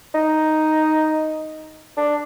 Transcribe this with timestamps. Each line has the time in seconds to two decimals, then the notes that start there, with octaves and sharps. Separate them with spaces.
0.15 D#4
1.97 D4